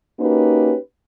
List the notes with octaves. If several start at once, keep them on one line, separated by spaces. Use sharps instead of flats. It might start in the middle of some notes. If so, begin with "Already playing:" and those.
A#3 C#4 D#4 F#4 G4 B4